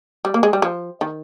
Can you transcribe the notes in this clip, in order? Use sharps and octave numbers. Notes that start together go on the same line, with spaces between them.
G3
A#3
G#3
G3
F3
D#3